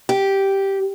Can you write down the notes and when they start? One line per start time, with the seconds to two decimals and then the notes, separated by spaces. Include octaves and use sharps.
0.09 G4